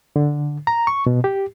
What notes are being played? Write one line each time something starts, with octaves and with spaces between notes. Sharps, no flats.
D3
A#5
C#6
B2
G4